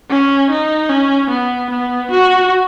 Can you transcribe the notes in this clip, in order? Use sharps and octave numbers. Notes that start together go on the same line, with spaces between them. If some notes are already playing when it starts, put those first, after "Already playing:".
C#4
D#4
C#4
B3
B3
F#4